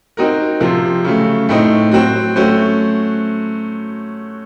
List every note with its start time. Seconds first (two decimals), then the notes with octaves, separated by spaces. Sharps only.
0.17 C4 D#4 F#4 A#4
0.60 C3 F3 C4
1.05 C#3 F#3 A3
1.49 A2 A3 C4 D#4
1.92 F#3 C4 F#4
2.36 F#3 A3 C#4 F#4 C5